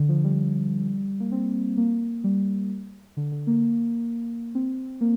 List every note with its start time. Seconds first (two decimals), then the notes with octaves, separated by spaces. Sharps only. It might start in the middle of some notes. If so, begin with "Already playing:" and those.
Already playing: D3
0.09 F3
0.24 G3
1.20 A#3
1.32 C4
1.77 A#3
2.24 G3
3.17 D3
3.32 D3
3.47 A#3
4.55 C4
5.01 A#3